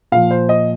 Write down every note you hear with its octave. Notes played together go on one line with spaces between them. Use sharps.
A#2 F3 F5
C5
D#5